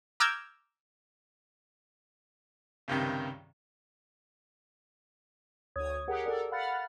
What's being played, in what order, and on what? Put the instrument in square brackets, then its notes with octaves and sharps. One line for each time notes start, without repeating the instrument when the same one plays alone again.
[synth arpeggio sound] A#5 D6 E6 F6 G6 G#6
[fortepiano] C#2 G2 C3 D#3
[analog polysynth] D2 C#5 D#6 G#6
G4 G#4 A#4 F#5
A4 A#4 D5
F5 F#5 B5 F6 A6